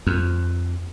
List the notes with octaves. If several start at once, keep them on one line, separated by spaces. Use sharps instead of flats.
F2